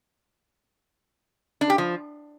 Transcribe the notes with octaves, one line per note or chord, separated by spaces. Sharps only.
D4
G4
F3